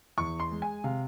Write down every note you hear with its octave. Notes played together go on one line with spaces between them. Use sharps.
E2 C#6
C6
G#3
G#5
C3 F5